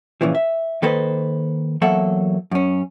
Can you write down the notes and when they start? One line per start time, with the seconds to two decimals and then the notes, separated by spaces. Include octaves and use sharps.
0.21 A#2 C#3 E3 F3
0.35 E5
0.82 D#3 A#3 A4 B4 C5 D#5
1.81 E2 F#3 A#3 A4 E5 F#5
2.51 F#2 C#4